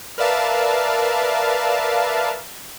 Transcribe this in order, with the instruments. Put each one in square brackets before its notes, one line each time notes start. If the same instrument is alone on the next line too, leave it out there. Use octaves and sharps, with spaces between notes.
[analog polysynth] A#4 B4 D5 E5 F5 A5